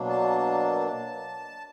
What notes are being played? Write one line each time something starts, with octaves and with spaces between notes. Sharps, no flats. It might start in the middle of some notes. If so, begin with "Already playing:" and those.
Already playing: B2 F#3 A#3 D4
A5